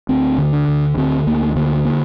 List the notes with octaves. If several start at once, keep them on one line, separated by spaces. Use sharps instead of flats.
D2 C4
D3
D4
D2
D3 C4
D2 A#3
D3 A#3
A#3